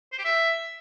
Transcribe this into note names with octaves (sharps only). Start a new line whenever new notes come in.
C5
G4
E5